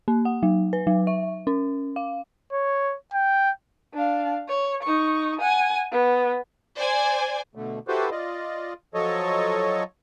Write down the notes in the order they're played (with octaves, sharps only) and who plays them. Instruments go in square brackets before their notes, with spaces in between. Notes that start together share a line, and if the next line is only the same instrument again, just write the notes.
[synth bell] A#3
F#5
F#3
B4
F#3
E5
C#4
F5
[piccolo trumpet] C#5
G5
[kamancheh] D4 F5
C#5
D#4 C#6
F#5 G#5
B3
[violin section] C5 D5 G#5
[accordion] B2 D3 A3
E4 F#4 G4 A4 B4 C5
F4 D5 D#5
F3 F#3 A4 C#5 D#5